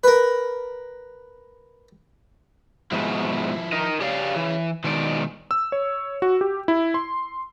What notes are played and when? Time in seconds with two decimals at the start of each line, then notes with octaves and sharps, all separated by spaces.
0.04 A#4 B4
2.92 G#2 B2 F3 E4
3.72 D#4 A#4 D#5
4.01 G4 G#4 C#5 D5 F5
4.36 E3
4.84 B2 D#3 G#3 D5
5.51 E6
5.72 C#5
6.22 F#4
6.41 G4
6.68 E4
6.94 C6